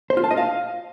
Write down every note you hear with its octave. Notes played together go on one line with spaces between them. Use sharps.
C5
F4
A5
D#5
F5